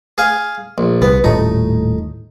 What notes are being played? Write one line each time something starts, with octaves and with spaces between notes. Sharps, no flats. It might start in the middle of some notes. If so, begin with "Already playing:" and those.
G#4 F5 G#5
A#1
C2 B3
D#1 A2 A3 D#4